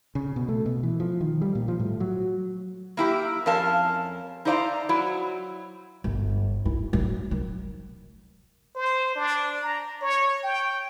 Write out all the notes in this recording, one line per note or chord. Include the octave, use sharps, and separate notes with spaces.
C#3
B2
A3
B2
E3
F3
D#3
G3
A#2
F3
A2
F#3
A#3 E4 G4
F2 C#4 A#4 F5 A5
D#4 E4 C5 D5 F5 A#5
F#3 E4
G1
E4
F#3
D#3
C5
D4
A#5
C#5
G5